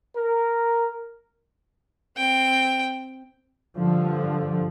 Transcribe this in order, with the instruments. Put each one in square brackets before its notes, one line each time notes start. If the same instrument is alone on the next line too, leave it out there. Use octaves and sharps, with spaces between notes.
[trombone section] A#4
[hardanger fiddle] C4 G5
[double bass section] G2 D3 F3